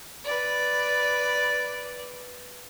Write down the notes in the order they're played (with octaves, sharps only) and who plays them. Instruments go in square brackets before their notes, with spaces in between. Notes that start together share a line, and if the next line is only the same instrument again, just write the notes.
[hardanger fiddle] B4 D5